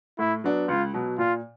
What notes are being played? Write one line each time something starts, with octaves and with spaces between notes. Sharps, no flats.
A2 E4
F#3 B3 D4
C#2 F4
B2 F#3
A#2 F4